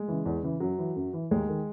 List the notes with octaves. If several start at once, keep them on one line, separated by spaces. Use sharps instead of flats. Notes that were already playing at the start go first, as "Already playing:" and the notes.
Already playing: G#3
C#3 E3
E2
C#3 E3
F#2 F#3
E3
F#2
E3
D#2 G#3
D#3